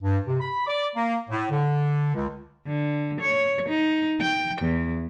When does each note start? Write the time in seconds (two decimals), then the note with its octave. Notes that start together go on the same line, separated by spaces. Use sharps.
0.03 G2
0.27 C3
0.40 B5
0.67 D5
0.96 A#3
1.29 A2
1.51 D3
2.15 C#2
2.67 D3
3.21 C#5
3.69 D#4
4.21 G5
4.62 E2